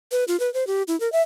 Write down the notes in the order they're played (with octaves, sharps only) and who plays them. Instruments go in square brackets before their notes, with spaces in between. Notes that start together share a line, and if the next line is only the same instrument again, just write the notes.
[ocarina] B4
F4
B4
C5
G4
E4
A#4
E5